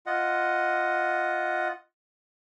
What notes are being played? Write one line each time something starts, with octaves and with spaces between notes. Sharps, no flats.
F4 D#5 F#5